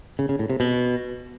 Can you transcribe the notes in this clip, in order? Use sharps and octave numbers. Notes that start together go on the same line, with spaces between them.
C#3
C#3
A2
C3
B2